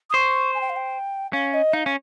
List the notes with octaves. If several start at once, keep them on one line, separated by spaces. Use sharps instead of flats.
D#6
C5 C#6
G#5
G5
F5
G5
C#4 F5
D#5
D#4 F5
C#4